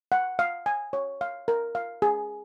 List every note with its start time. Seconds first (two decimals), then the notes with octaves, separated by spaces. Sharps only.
0.12 F#5
0.39 F5
0.66 G#5
0.93 C#5
1.21 F5
1.48 A#4
1.75 F5
2.02 G#4